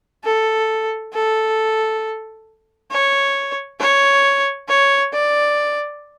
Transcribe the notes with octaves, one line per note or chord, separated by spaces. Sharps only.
A4
A4
C#5
C#5
C#5
D5